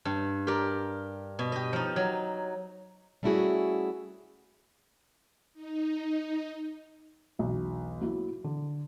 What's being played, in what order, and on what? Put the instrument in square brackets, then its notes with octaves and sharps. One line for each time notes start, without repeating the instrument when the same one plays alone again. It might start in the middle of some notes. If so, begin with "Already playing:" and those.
[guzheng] G2
G4 A#4 D5
B2
G4 D#5
F3 D#4
F#3
[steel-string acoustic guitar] G3 A3 C#4 E4 F#4 G#4
[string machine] D#4
[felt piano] E1 B1
F#3 A#3 E4
D3